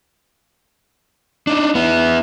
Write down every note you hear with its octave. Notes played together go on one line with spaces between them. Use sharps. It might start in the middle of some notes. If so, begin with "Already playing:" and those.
D4 D#4
B3 E4